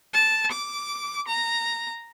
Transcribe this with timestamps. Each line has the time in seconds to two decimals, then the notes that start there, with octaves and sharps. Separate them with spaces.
0.13 A5
0.51 D6
1.27 A#5